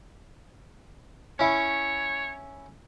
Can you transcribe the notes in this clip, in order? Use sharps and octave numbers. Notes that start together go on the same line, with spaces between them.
C#4 E4 C#5